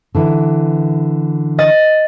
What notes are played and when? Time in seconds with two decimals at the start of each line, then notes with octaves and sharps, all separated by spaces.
0.15 D3 E3 E4
1.58 D#5 A6